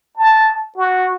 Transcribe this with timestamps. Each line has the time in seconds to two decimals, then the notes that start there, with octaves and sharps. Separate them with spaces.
0.17 A5
0.78 F#4